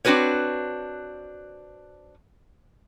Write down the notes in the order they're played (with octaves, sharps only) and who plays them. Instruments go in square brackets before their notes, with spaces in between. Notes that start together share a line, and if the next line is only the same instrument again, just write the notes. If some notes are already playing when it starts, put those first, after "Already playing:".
[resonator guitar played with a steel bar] C4 D4 F#4 B4 C#5